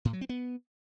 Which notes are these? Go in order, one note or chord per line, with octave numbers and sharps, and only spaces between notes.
A2
F#3
C4
B3